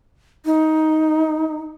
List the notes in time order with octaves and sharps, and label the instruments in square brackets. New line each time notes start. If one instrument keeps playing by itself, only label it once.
[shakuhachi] D#4